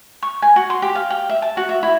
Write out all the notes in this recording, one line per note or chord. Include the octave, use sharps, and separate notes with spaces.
C#6
G#5
F#4
C6
G4
F5
G5
E5
A5
F#4
E5
E4